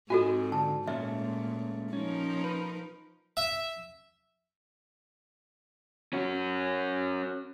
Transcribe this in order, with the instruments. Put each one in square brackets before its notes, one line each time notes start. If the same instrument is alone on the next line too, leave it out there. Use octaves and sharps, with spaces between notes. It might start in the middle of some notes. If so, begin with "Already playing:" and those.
[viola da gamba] G#2 [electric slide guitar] C4 D#5 G#5 [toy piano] F4 F#4 A4
[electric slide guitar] D3 [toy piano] A5
[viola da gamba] A#2 [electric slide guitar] G#3 A3 C#4 [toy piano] E5
[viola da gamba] F3 D#4 A#4 [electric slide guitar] C#4
[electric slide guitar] B4
[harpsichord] E5
[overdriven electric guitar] C#4 F#4